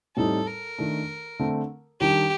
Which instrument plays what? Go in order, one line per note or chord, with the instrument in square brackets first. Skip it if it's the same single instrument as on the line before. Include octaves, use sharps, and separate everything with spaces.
[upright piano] A2 G3 C4 D#4 [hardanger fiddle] A4
[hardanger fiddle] A#4
[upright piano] D#3 A3 D4
D3 A3 C4
[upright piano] D#3 G3 D4 [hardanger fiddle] G4